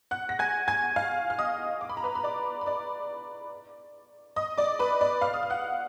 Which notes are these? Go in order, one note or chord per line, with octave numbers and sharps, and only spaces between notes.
F#5 F#6
A#6
G#5 G#6
G#5 G#6
F5 F6
F6
D#5 D#6
D6
B5
A#5
B4 B5
B5
D5 D6
B5
D5 D6
D#5 D#6
D5 D6
B4 B5
D5 D6
F5 F6
D#6
F6
F#5 F#6